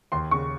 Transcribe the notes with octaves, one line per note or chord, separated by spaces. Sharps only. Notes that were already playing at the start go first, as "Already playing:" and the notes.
D#2 C6
C#3 C#6